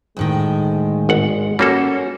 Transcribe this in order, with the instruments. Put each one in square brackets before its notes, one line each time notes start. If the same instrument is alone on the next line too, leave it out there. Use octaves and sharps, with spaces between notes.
[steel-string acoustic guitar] D2 A2 D#3 [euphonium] G#3
[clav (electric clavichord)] G#1 F#5
[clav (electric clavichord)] G3 A#3 A4 [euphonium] C#4 [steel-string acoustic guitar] F#4